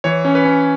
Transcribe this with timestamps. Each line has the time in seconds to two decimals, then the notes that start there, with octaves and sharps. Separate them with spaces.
0.04 E3 C#5
0.25 C#4
0.35 B4
0.45 C#4